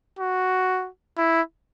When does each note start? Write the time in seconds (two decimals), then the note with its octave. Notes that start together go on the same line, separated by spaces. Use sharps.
0.19 F#4
1.18 E4